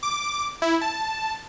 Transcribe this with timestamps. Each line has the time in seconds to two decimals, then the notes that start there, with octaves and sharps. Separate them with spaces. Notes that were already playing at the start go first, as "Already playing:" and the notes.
0.03 D6
0.62 E4
0.81 A5